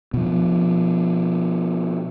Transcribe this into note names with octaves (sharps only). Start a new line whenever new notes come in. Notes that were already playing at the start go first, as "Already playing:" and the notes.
B2 F3